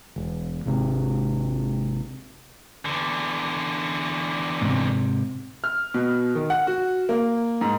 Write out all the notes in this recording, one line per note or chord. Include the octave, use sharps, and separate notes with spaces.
E1
G#1 C3
E2 D3
G#2 C3
F6
B2
D#3
F#5
F#4
A#3
G#2